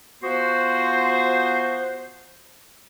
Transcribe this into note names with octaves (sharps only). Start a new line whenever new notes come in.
F3 B3 F#4 C5